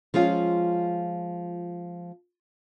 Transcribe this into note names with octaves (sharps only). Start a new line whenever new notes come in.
F3 G#3 C#4 F4